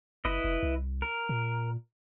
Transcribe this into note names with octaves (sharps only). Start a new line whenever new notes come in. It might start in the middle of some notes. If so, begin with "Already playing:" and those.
F#1 E4 B4 D#5
F1
C2
A#4
A#2